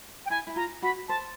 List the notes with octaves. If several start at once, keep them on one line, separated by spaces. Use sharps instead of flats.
G5
E4 G#5
E4
F4 A#5
F#4 B5
C5 A5